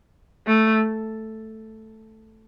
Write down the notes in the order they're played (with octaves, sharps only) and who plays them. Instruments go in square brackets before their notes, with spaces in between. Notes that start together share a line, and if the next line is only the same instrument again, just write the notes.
[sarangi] A3